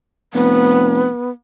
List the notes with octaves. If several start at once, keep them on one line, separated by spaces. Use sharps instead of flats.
F1 B3